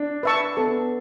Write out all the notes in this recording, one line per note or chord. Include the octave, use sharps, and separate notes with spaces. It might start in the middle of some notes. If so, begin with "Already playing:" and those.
Already playing: D4
B4 E5 A5 C#6
B3 A4